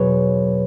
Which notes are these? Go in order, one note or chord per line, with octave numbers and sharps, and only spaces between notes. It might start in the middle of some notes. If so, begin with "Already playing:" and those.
Already playing: E2 B2 F#3 G#4 B4 C#5